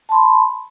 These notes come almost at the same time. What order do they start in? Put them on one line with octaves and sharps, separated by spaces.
A5 C6 B5